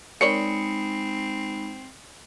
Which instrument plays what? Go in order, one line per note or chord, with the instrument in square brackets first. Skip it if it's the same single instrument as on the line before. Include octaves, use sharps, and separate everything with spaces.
[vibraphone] G#3 D#4 B5 [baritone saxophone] C4 [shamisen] A#4 C#5 D5 [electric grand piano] C#7